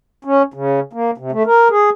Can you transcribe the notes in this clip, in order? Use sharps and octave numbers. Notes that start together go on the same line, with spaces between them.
C#4
C#3
A#3
C3
A3
A#4
G#4